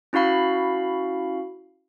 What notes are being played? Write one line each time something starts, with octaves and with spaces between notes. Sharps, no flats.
C#4 E4 F#4 F5 B5